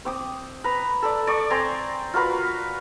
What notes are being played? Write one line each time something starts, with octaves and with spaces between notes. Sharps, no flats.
C4 D6 D#6
B4 A#5
A4 D5
D5 C#6
C4 G#5 A#5 C6
F4 F#4 A#4 B4